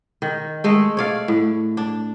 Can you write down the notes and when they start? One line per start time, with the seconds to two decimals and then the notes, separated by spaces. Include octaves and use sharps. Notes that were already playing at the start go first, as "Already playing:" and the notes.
0.22 D#3
0.64 G#3 A3
0.97 C#5 D5 F5
1.28 A2
1.77 D4